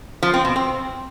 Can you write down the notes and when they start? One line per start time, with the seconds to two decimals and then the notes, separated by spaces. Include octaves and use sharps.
0.23 F3
0.34 C4
0.45 B2
0.56 C4